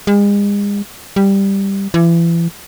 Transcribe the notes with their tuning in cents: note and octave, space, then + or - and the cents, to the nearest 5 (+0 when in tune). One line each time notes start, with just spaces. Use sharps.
G#3 -40
G3 +5
E3 +35